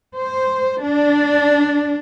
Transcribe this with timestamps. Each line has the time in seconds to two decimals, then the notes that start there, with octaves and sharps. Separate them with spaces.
0.15 C5
0.81 D4